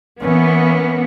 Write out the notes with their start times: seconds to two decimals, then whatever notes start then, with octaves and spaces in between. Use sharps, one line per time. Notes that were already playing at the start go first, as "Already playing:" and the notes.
0.20 E3 A#3 B3 C#4